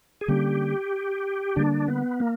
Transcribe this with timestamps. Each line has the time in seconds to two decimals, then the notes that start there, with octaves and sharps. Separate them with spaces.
0.21 G#4
0.28 D3 G3 A#3 C#4 G4
1.56 D3 G3 A#3 D4
1.88 B3
2.20 A#3